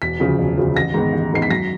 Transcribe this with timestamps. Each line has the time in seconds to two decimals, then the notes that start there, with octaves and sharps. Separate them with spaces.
0.02 E1 B6
0.20 D2 C#3 F3
0.39 E1
0.57 D2 C#3 F3
0.76 A1 A#6
0.94 G#2 D#3 G#3 B3
1.13 A1
1.32 G#2 D#3 G#3 B3 C7
1.42 B6
1.50 F#2 A#6